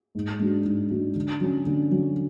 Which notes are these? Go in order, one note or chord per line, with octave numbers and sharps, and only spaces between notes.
G#2
G#3 D4 F#4
G#2
G#3 D4 F#4
D3
F#3 C#4
D3
F#3 C#4